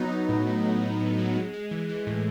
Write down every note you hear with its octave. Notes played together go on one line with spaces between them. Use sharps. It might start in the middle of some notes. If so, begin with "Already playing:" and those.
Already playing: F#3 B3 D#4
F#3
A2
A2
A2
A2
A2
F#3
G#3
G#3
E3
E3
A2